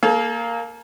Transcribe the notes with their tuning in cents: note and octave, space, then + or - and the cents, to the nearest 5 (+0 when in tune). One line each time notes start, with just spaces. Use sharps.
A#3 +0 A4 -45 F5 +0